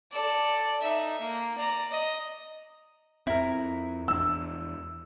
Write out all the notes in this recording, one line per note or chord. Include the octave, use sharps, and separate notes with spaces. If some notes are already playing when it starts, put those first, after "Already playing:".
A4 D5
D#4 E5
A#3
D5 A#5
D#5
F2 C4 E4 A#4
E2 B3 D4 E6